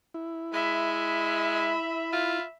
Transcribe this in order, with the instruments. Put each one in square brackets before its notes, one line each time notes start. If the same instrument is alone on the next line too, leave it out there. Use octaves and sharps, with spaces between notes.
[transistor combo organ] E4
[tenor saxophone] G#3 [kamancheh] E5 B5
[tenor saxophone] F4